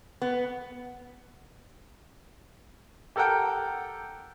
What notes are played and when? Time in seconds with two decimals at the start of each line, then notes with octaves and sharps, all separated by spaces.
0.22 B3
3.16 G4 A4 A#4 F#5 G5